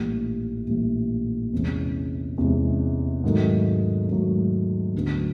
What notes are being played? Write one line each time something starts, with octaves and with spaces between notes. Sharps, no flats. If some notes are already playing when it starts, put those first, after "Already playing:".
Already playing: A#1 A2 E3 G3
A#1 A2 E3 G3
E2 C3 E3 G#3 C#4
E2 C3 E3 G#3 C#4
G#2 D#3 F#3 A3
G#2 D#3 F#3 A3
D2 D3 F#3 B3